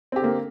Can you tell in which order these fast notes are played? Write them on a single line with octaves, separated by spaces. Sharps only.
C4 G4 D3 A#3